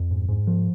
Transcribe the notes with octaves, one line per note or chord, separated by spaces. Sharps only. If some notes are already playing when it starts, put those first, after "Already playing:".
Already playing: F2
G#2
G#2
F3